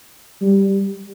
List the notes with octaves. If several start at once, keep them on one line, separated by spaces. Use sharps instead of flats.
G3